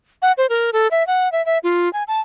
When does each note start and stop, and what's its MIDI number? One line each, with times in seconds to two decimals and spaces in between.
0.22 0.32 78
0.38 0.47 72
0.49 0.71 70
0.73 0.88 69
0.91 1.06 76
1.07 1.31 78
1.32 1.44 76
1.46 1.58 76
1.63 1.91 65
1.93 2.03 80
2.08 2.21 81